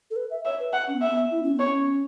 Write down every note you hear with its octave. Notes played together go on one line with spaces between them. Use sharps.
A4
B4
E5
C#5 E5
B4
F#5
C#4
B3
E5
B3
E4
C#4
B3
C#5
C#4